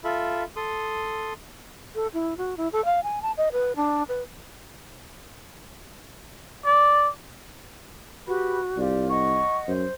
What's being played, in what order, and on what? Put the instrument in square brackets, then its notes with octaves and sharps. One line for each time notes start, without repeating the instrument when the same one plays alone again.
[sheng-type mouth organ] F4 A4 E5 B5
A4 C6 D#6
[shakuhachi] A4
E4
F#4
E4
A4
F5
G#5
A5
D#5
B4
D4
B4
[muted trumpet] D5
[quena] F#4 [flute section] G4 B4 B5
[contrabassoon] C2 [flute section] F4 G4 D5
[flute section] D#5 F#5 [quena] C#6
[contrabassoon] F#2 [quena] C5